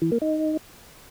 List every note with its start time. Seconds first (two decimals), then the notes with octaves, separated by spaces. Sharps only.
0.02 E3
0.12 A#3
0.22 D#4